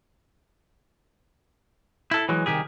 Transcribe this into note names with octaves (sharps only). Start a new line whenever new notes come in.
E4 A4
E3 F#3 G#3
C2 D#3 G4 G#4